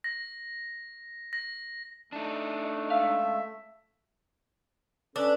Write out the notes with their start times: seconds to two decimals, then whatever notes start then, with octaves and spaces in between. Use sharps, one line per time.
0.04 A#6
1.33 A#6
2.12 A3 D4 D#4
2.90 C#2 E5 F5
5.16 C#4 D4 A4 B4